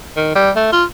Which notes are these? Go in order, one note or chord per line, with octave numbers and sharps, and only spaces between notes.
D#3
G3
A3
F4